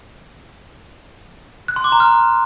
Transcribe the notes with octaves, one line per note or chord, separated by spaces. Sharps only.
F#6
C6
D6
A#5
F6